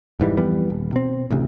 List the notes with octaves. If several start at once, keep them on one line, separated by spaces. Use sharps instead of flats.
F1 G#2 E3 G3
F2 E3 G3 B3
D#1
B2 C4
A1 D2 C3